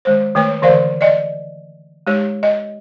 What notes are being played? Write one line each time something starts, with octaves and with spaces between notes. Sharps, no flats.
D#3 G#3 C5
D#3 A3 B4 C#5
D3 E3 A#4 C5 D5 F5
D5 D#5
G#3 D#4 G4 C#5
D#5